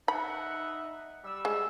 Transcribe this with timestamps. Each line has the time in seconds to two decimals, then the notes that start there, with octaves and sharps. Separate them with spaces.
0.08 D#4 E5 F#5 B5
1.24 G3 E6
1.45 G#3